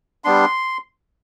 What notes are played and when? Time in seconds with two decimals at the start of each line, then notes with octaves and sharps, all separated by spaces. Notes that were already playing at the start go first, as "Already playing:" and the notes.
0.24 G3 B3 D4 C6